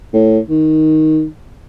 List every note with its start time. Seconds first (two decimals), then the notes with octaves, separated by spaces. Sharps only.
0.13 A2
0.49 D#3